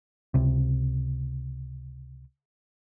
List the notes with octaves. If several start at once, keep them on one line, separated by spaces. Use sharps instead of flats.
C#2 C3